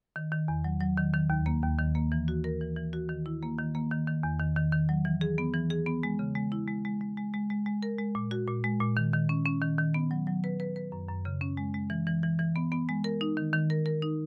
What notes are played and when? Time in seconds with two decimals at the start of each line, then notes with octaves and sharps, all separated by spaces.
0.16 D#3
0.32 D#3
0.48 E2
0.64 F#3
0.80 F#3
0.97 D#3
1.14 D#3
1.30 D#2
1.46 A#3
1.63 D#2
1.79 D#3
1.95 A#3
2.12 E3
2.28 F#4
2.44 A#4
2.61 E3
2.76 E3
2.93 F#4
3.09 D#3
3.26 E4
3.43 A#3
3.58 D#3
3.75 A#3
3.91 D#3
4.07 D#3
4.23 E2
4.39 D#3
4.56 D#3
4.72 D#3
4.89 F#3
5.05 E3
5.21 G#4
5.38 B3
5.54 E3
5.70 G#4
5.86 B3
6.03 G#3
6.19 C#3
6.35 G#3
6.52 E4
6.68 G#3
6.85 G#3
7.01 G#3
7.17 G#3
7.34 G#3
7.50 G#3
7.66 G#3
7.83 A#4
7.99 G#3
8.15 A#2
8.31 F#4
8.48 A#2
8.64 G#3
8.80 A#2
8.97 D#3
9.13 D#3
9.29 C#4
9.45 C#4
9.62 D#3
9.78 D#3
9.94 B3
10.11 F#3
10.27 F#3
10.44 B4
10.60 B4
10.76 B4
10.92 F#2
11.09 F#2
11.25 C#3
11.41 C#4
11.57 G#3
11.74 G#3
11.90 E3
12.07 E3
12.23 E3
12.39 E3
12.56 B3
12.72 B3
12.89 G#3
13.04 A#4
13.21 D#4
13.37 D#3
13.53 D#3
13.70 A#4
13.86 A#4
14.02 D#4